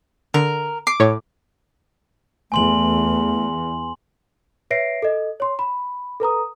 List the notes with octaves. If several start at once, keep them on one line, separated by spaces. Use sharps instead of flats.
D3 A#4
D6 C7
A2 C#5
E2 A3 G#5 C6 F#7
B4 C#5 E5 A#6 C7 D7
A4 D#5
C#5 C6
B5
A4 B4 A#5 D#6